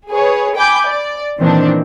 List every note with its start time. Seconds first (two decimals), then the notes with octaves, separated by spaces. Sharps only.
0.11 G#4 B4 C#5
0.57 G5 G#5 B5 D6 G6
0.88 D5
1.39 A#2 D#3 E3 C4 D4